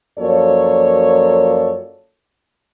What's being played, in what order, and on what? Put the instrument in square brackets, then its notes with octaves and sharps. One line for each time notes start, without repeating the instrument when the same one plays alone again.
[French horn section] F#2 F3 A#3 A4 C#5 D5